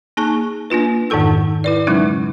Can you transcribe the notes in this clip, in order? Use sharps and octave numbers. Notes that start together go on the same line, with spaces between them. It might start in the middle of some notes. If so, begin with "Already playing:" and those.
A#3 D#4 G#4 A5 C#6 F#6
A#3 D4 F4 B4
F2 G#2 D#3 D#4 A4 E6
E4 B4 D5
C#3 F#3 G#3 C#4 D#4